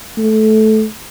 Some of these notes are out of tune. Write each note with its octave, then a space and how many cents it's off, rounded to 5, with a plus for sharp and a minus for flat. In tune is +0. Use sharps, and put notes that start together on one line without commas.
A3 -15